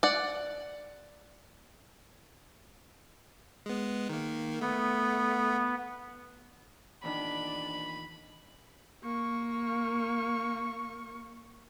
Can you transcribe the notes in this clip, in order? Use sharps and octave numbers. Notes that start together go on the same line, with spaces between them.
D5 F#5
G#3 B3
D#3 A#3
A3 B3
E2 A#2 D#3 D4 B5
A#3 C#6